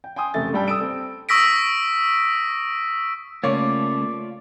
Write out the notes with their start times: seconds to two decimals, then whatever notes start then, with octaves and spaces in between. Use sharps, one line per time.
0.04 G5
0.16 G5 G#5 C6 D#6
0.34 F#1 C3 A3 A6
0.53 G2 G3 A4 G5 A5
0.68 D#6 E6 D7
0.81 C4 A4
1.29 C#6 D#6 E6 A#6 B6 D7
3.44 C#3 A3 A#3 F4 C#5 D5